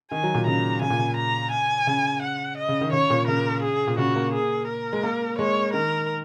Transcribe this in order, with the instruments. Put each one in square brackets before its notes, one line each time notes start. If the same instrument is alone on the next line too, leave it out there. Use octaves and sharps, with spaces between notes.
[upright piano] D#3 [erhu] G#5
[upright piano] F#3
A#2
[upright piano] C#3 [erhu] A#5
[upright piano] C#3 [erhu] G#5
[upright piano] A#2
C#3
[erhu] A#5
G#5
[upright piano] C#3
[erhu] F#5
D#5
[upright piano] C#3
D#3
[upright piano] C#3 [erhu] C#5
[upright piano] A#2
[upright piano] C#3 [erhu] A#4
[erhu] G#4
[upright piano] A#2
[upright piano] C#3 [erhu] F#4
[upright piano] A#3
[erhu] G#4
A#4
[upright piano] G#3
A#3
[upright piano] G#3 [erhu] C#5
[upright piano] D#3 [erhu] A#4